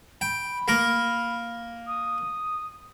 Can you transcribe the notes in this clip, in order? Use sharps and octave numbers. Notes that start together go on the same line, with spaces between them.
G5 B5
A#3 A#4
D#6